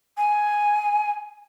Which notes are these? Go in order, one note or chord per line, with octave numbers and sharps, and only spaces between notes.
G#5